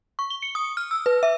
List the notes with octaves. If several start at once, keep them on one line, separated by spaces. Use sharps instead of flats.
C#6
G7
C#7
D#6
F6
E6
B4
E5